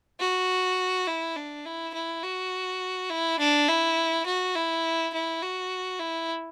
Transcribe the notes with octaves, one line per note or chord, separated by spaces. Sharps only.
F#4
E4
D4
E4
E4
F#4
E4
D4
E4
F#4
E4
E4
F#4
E4